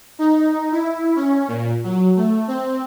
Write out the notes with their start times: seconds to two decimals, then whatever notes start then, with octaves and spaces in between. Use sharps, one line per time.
0.19 D#4
0.72 E4
1.16 C#4
1.48 A#2
1.84 F#3
2.17 A3
2.48 C4